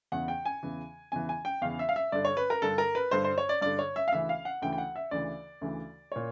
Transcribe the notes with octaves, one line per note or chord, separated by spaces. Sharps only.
E2 C#3 E3 F#5
G5
G#5
E2 C#3 E3
E2 C#3 E3 G#5
G#5
G5
E2 C#3 E3 F5
E5
F5
E5
G2 D3 D5
C#5
B4
A#4
G2 D3 A4
A#4
B4
G2 D3 C5
C5
C#5
D5
G2 D3 D5
C#5
E5
F5
D2 C#3 E3 E5
F5
F#5
D2 C#3 E3 G5
G5
F#5
E5
D2 C#3 E3 D5
D2 C#3 E3
A#2 C#5